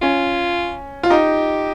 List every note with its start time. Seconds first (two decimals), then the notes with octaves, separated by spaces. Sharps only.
0.01 C#4 F4
1.03 F4
1.10 D#4 G4